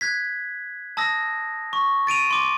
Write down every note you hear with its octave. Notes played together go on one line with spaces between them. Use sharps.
F#6 G#6 B6
A5 D#6 E6 A#6
C#6
A6 D7 D#7 F7
C6 D6